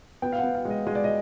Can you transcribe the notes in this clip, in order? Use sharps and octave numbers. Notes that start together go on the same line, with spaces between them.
B3 G5
F5
B3 F#5
F5
G#3
D#5
G#3 D#5
D5
D#5